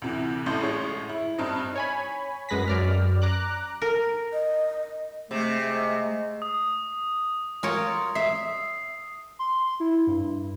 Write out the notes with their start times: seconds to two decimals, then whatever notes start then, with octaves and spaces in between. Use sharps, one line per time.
0.02 D2 C3 E3
0.46 A1 A2 A3 C6 G6
0.63 A1 G#3 C#5
1.09 E4
1.38 G2 C4 D#4
1.75 C#5 G#5 B5
2.49 F#2 G#3 B4 A#6 B6
2.68 F#2 D5 F6
3.22 A#5 D6 F#6
3.82 A#4
4.33 D#5
5.31 C3 G#3 A3
6.42 D#6
7.63 F4 A#4 C#5
8.15 E5 C7
9.39 C6
9.80 E4
10.07 G2